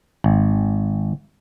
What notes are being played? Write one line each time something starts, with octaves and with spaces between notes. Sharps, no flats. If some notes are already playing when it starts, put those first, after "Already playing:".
G#1